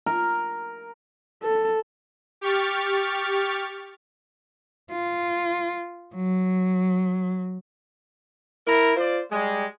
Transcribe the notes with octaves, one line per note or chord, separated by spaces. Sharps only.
A#4
A4
G4 C#6 F6 A6
F4
F#3
E4 A#4
F4 C5 D5
G3 G#3